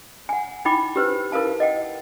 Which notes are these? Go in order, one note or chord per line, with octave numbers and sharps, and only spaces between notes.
F#5 G#5
D#4 E4 G5 B5 D6
G4 B4 C5
E4 A#4 B4 F5 A5
D#5 F#5 G5